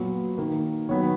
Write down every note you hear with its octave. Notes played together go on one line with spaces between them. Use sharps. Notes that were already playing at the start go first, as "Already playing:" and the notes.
Already playing: A#2 F#3 B3
D#3 A#3
D#3 F#3 B3 C#5